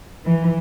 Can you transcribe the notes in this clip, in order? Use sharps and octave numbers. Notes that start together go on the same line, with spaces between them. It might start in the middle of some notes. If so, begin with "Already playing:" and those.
E3